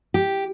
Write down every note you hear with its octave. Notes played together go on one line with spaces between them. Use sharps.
G4